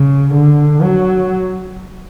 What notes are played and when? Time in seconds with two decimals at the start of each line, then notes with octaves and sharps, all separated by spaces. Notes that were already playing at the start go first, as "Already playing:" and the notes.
Already playing: C#3
0.34 D3
0.82 F#3